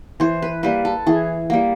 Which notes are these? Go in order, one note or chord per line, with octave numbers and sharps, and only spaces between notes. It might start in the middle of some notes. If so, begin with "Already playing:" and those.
E3 C5
B4
G3 A#3 B4
A4
E3 G#4
G3 A#3